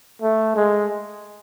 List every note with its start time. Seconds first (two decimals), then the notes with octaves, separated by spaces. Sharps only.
0.22 A3
0.56 G#3